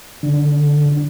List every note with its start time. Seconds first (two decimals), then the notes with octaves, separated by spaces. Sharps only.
0.23 D3